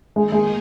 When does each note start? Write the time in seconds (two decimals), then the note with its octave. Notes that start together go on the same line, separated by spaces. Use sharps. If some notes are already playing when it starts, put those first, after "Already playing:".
0.16 D#3 G#3 A#3 D#4 G#4
0.32 G#3